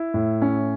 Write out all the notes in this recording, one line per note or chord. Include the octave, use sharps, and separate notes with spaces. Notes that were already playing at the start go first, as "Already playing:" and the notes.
Already playing: E4
A2
C#4